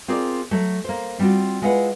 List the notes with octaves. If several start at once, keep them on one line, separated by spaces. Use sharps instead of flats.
C4 F4 G#4 A#4 D5
F#3 A3
A#3 C5
G3 C4 F4 F#4
G#3 E4 F4 B4 F#5